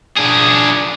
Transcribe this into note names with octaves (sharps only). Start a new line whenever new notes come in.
D4 G#4